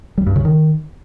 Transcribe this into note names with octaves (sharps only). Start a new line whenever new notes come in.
G3
G2
C#3
D#3